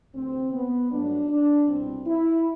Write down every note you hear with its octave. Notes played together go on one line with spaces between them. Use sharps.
D2 C3 E3 C4
B3
G2 F#3 A3 D4
D4
C2 B2 G3 C4
E4